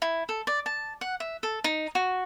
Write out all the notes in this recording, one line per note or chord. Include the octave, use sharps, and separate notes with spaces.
E4
A4
D5
A5
F#5
E5
A4
D#4
F#4